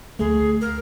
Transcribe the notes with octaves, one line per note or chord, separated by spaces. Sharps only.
D2 A3 G#4
A#4